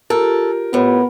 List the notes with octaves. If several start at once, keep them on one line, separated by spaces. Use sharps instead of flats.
F4 G4 A4 A#4
F2 A2 B3